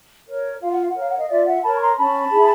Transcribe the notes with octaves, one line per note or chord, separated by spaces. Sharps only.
A#4 C#5
F4 F5
F#5
F5
F#5
A#4 C#5 F5
F#5
D#5 F5
F4 D5 E5
E5 F#5
A#4 C#5 A5 B5
C#6
A#5 C6
C#4 A5 B5
E4 G#4